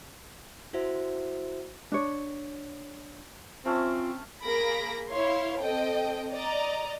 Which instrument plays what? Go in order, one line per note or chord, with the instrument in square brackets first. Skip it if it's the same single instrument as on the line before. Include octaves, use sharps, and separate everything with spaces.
[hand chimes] E4 F#4 C5 E5
[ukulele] D4 C#5
[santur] A3 C#4 A4 [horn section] C4 [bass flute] F4
[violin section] A#3 G#4 A#4 B5 A#6 D7
E4 C#5 F5 C6
C4 A4 D#5 G5
D5 D#5 A#5